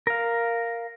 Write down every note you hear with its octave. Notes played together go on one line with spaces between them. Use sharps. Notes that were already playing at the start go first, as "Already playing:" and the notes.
A#4 F5